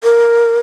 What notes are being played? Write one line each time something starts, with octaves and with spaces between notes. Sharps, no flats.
A#4